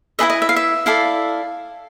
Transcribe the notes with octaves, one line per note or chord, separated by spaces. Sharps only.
E4 G#4 B4 D#5 E5
D#5
E5
F5
E5
E4 A4 D5 F5